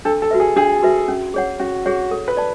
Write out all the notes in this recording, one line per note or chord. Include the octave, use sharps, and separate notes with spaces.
D4 A4
A4
F#4 B4 E5
G#4
D4 G#4
F#4 B4 E5
C#4
G#4 C#5 F#5
C#4 F#4
F#4 G#4 C#5 F#5
A4
B4
D5 A5